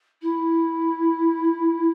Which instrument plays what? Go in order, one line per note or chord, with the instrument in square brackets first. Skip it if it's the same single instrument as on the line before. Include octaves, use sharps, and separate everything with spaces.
[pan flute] E4